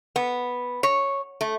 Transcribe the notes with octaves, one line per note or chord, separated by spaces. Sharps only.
B3
C#5
A3